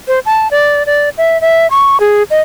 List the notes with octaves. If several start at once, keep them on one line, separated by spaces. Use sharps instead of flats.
C5
A5
D5
D5
E5
E5
C#6
G#4
D#5